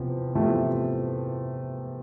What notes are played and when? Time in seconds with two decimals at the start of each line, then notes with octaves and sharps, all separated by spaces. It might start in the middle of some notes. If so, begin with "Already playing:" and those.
Already playing: E2 C3 F3
0.35 E2 C3 F3 A3